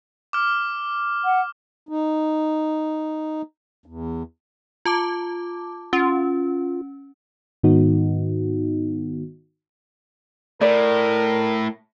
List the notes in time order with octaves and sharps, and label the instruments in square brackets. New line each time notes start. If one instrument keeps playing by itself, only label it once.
[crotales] D6 F6
[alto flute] F#5
[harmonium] D#4
E2
[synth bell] F4 A5 D6
[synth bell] C#4 [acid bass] F4
[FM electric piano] G#2 D#3 B3 D#4 F#4
[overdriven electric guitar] A2 [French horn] A#4 [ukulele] D5